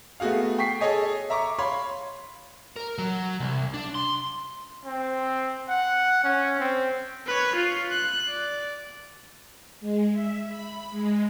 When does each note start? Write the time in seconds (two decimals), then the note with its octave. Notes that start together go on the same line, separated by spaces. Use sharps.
0.20 A3 B3 F#4 G#4 F5
0.58 G5 C#6 B6 C7
0.81 G#4 A4 C#5 D#5 G#5
1.30 E5 A#5 C#6 D6
1.59 C#5 F5 B5 C6
2.76 A#4
2.98 F#3
3.40 C2
3.74 D4
3.95 C6
4.85 C4
5.69 F#5
6.24 C#4
6.59 C4
7.27 B4 C#5
7.56 F4
7.91 F#6
8.28 D5
9.80 G#3
10.11 E5
10.49 B5
10.91 G#3